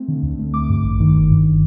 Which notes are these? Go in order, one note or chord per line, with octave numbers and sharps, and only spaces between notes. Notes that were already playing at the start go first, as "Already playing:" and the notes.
Already playing: A3 C4
D3
D2
A3
A3 D6
G2
A1
D#3
G1
G2